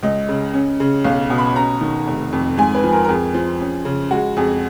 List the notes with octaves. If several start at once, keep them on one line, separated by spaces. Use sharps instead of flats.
C#2 D#5
C#3
C#4
C#3
B1 F5
B2
B5
C#4 A#5
D#3
F1
F2
G#2 G#5
B4
F3
A#4
A#4
F2 G#4
F3
C#4
C#3
G#3 F#4
F2 G#4